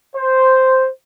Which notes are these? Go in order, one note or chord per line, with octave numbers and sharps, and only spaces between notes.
C5